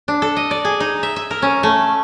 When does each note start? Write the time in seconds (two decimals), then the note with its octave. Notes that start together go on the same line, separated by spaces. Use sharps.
0.08 D4
0.22 A4
0.36 D#5
0.51 D5
0.65 G#4
0.80 D#4
1.03 E5
1.16 E5
1.31 A#4
1.42 C#4
1.63 A3